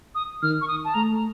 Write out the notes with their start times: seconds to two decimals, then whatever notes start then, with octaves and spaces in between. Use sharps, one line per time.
0.15 D#6
0.42 D#3 F6
0.61 C#6
0.68 D#6
0.85 A5
0.94 A3 A#5